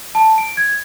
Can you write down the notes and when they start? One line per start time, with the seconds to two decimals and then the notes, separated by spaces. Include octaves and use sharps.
0.15 A5
0.38 D7
0.57 G#6